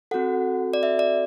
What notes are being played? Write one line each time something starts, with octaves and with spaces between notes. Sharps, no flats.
C4 F#4 A4 F#5
D5
E5
D5